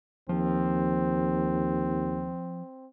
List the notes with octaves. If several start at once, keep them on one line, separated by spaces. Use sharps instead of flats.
D#2 F3 C4